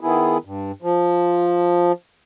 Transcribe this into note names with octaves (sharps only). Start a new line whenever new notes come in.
D#3 B3 E4 G#4
G2
F3